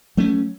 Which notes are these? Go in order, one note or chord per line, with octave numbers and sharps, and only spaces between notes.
F#3 A3 C#4